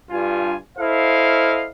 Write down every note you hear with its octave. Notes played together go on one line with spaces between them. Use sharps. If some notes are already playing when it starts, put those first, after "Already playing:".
G2 F4 G#5
E4 A4 C5 D#5 F5